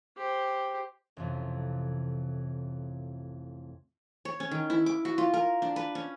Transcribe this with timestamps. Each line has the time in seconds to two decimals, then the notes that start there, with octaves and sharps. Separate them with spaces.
0.17 G4 C5
1.17 A1 F2 C3
4.25 C#5
4.40 C#4
4.51 D#3
4.70 E4
4.86 D6
5.05 F#4
5.18 F4
5.34 A#4
5.62 D4
5.76 B4
5.95 C#4